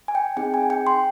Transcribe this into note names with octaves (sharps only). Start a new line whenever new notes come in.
G#5
G5
C4 D#4 G#4 G5
G#5
G5
C6